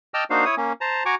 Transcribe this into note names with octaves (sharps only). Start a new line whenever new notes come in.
D#5 G5 A5 D6 E6 F6
A#3 D4 D#4 F#4 C5 F5
E4 C#5 D#6
A#3 C#4
C5 A5 A#5
F#4 G#5 A#5 C#6 D6